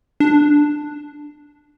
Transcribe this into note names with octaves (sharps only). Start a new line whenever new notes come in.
D4